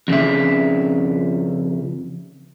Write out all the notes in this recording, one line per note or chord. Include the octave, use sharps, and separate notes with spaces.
F2 C#3 E5